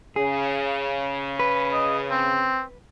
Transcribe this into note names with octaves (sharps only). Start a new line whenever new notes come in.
C#3 G#4
B4
D#5
C4